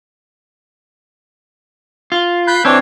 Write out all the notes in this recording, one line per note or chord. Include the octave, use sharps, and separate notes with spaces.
F4
B5 F#6 G6
E3 C4 D4 C#5